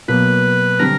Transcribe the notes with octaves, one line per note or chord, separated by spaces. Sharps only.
B2 F#3 A#3 B4
D3 G3 C4 A#4